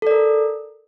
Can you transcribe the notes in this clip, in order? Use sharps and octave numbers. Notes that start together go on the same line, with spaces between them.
A4 A#4 D5